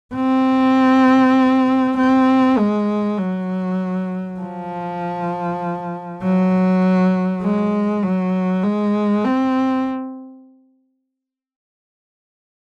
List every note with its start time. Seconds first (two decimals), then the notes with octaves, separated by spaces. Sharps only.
0.14 C4
1.97 C4
2.58 G#3
3.18 F#3
4.40 F3
6.22 F#3
7.43 G#3
8.03 F#3
8.64 G#3
9.24 C4